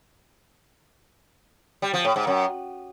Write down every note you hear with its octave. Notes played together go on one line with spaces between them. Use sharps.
G3
F3
A2
G#2
F#2